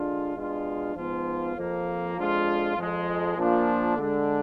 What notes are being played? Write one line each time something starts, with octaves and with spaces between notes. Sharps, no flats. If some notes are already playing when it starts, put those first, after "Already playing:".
Already playing: D3 G#3 D4 F4
B2 G#3 D4 F4
G#2 F3 B3 F4
F2 F3 A#3
F2 F3 G#3 D4 F4
F2 F3 G#3
A#2 F3 A#3 D4 F4
D3 G#3 D4